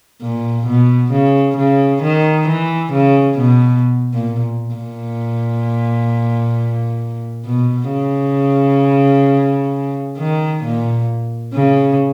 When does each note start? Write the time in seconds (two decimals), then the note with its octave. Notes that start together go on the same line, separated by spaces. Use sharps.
0.21 A#2
0.66 B2
1.12 C#3
1.57 C#3
2.02 D#3
2.48 E3
2.93 C#3
3.38 B2
4.13 A#2
4.74 A#2
7.46 B2
7.91 C#3
10.18 D#3
10.63 A#2
11.54 C#3